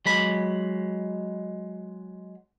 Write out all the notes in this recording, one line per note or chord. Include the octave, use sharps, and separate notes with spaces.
F#3 G#3 B5